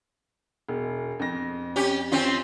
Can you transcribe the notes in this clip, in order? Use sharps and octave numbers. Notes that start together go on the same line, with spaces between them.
E1
F2 A#6
C#4 G4
C4 C#4 F4